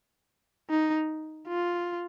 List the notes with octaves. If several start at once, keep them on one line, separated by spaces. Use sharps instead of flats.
D#4
F4